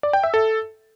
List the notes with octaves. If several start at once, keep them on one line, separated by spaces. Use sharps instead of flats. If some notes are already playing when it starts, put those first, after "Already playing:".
D5
G5
E5
A4